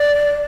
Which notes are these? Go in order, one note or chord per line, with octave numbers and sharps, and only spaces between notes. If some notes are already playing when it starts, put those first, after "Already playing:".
Already playing: D5